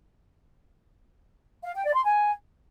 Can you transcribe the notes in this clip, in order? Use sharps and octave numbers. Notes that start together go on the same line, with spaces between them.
F5
G5
D5
C6
G#5